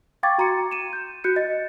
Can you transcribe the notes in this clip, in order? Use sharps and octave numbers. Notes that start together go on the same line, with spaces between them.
F5 G5 C#6 D6 G#6 A6
F#4 A#5 C6 C#7
D#7 E7
G6
F#4 F#6 G6 C#7
D#5 A6